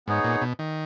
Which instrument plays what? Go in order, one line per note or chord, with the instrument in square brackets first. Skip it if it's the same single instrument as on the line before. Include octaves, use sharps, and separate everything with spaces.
[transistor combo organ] G#2 [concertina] B3 D#4 G#4 C#5
[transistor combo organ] A#2
B2
D#3